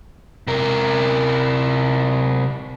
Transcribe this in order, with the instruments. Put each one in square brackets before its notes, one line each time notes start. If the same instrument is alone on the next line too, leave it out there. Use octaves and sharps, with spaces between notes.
[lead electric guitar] C3 A#4